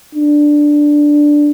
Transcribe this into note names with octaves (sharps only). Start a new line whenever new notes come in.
D4